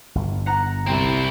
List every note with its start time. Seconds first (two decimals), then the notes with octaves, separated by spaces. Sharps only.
0.15 G1
0.46 F#5 A#5
0.87 C2 C4 E4